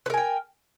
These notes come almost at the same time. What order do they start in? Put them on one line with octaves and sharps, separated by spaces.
B4 A#4 G#5 G5